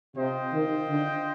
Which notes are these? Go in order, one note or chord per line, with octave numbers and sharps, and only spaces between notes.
C3 F4 C5 D#5 G5
D#3
D3